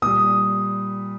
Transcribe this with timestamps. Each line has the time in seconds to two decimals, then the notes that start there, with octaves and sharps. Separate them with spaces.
0.02 A#2 G3 D#6